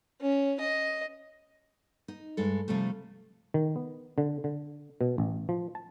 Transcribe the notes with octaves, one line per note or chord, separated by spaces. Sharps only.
C#4
D#5
D#4
G2 G#3 A4
C3 F3 G3 A3
D#3
B3
D3
D3
B2
A1
F3
A5